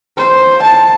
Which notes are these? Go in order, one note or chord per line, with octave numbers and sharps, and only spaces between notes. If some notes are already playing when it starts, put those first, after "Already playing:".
C5
A5